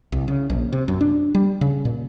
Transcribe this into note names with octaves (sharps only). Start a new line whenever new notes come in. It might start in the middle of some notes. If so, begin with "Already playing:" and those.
C2
C#3
A#1
C3
F#2
D4
G3
C#3
A#2